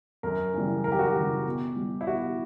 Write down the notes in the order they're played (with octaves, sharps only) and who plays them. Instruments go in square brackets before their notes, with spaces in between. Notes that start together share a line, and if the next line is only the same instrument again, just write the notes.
[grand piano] F#2 A#4
C#3 E3 G3
F#2 A#4
G4
F#4
G4
C#3 E3 G3
B2
G3
E4
B2 F#4